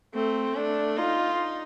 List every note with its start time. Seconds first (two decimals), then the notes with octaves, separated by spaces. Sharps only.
0.15 A3 C4
0.56 A3 D4
0.97 D#4 F4